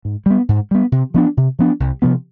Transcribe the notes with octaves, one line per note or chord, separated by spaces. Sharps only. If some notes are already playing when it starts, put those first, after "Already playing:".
G#2
G3 B3
G#2
G3 B3
C3
F3 B3 D4
C3
F3 B3 D4
C2
C3 F3 B3